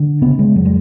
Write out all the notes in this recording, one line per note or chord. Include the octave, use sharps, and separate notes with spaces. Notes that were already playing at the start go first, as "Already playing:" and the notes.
Already playing: D3
C#3 B3
G#3
F2 F#3
G#3